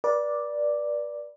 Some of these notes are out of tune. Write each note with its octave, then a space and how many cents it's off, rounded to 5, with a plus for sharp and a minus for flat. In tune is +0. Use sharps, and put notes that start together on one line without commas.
B4 -40 D5 +0